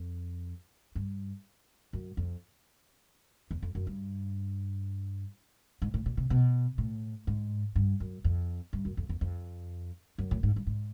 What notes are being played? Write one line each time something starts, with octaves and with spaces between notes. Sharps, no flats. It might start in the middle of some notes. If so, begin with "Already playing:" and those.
Already playing: F2
G2
F#2
F2
E2
F2
F#2
G2
G#2
A2
A#2
C3
B2
A2
G#2
G2
F#2
F2
G2
F#2
F2
E2
F2
F#2
A2
G#2
G2
G#2